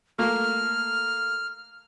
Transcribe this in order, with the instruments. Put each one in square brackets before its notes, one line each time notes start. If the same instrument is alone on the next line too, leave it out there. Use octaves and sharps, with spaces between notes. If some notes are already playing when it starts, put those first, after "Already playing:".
[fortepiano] A3 A#3 [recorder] F6